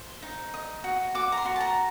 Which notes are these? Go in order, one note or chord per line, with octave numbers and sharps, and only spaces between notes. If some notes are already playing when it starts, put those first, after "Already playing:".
Already playing: C5
D#4
D#5
F#4
F#4 D6
A#5
C6
F#4
A5
A#5